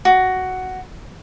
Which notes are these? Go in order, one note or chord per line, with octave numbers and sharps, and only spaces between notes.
F#4